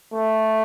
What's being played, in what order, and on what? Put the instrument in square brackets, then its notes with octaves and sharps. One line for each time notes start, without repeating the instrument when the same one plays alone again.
[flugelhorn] A3